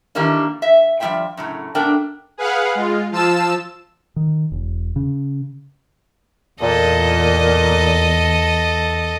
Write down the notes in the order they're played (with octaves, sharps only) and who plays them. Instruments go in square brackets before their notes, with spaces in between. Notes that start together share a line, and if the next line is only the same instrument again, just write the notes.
[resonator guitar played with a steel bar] D#3 E3 G3 A#3 D4
E5
F3 G3 B3 F4 E5 G5
F#2 A2 C#3
B2 A3 D4 A#4 D5 G5
[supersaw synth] G#4 B4 F5 F#5
G#3 F4
F3 F4 A5 E6 E7
[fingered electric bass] D#3
E1
C#3
[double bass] E2 [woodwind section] A#2 [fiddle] A4 D#5